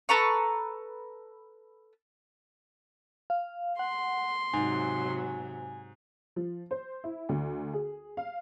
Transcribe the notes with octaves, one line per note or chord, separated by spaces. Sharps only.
A4 B4 A#5 C#6
F5
F#5 C6
G#2 C3 F#3 G#5
F3
C5
E4
D2
G#4
F5